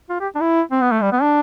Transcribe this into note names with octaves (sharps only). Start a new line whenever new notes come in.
F4
G4
D4
E4
C4
B3
A3
G3
B3
D4